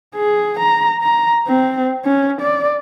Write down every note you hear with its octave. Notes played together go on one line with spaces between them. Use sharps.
G#4
A#5
A#5
C4
C#4
D5